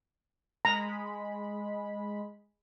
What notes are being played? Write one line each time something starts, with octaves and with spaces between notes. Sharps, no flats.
G#3 A#5 B5